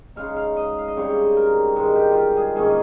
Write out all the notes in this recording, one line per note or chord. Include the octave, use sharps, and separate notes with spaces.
C#3 G#3 D#4 F5
F5
D#5
F5
D#5
C#3 G3 C4 D#4 C#5
A#4
G2 D#3 G#3
G4
F4 G4
G#4
G#2 D#3 A#3 C#4 G#4